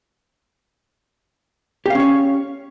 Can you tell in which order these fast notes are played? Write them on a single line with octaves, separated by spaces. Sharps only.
G4 F5 C#4 C#5